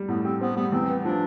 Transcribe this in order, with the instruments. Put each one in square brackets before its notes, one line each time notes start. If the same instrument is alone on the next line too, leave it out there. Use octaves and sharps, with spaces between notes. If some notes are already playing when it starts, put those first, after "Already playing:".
Already playing: [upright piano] G3
[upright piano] A2 [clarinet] B3
[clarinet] C4 [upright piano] G4
[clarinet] B3 [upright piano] C4
[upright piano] G3 [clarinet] B3
[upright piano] E2 [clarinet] C4
[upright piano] B3
[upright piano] F3 [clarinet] D4